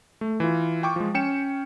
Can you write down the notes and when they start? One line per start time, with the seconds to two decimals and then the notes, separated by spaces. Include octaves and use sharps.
0.21 A3
0.40 E3 F4
0.83 F4 G5 C#6 D6
0.96 F3 G#3
1.14 C#4 G5 C#7 E7